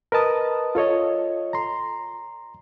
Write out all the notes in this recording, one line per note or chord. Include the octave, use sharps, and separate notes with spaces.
A#4 B4 D#5 A5 D#6
F4 A4 C#5 D#5
A#5 C6